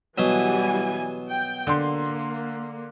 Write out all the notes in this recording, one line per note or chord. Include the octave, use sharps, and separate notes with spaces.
B2 E3 F#3 G3 G#5
G5
D3 A#3 C6